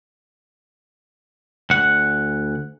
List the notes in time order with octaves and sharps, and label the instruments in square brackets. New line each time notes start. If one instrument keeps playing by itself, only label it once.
[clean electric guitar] D2 F#5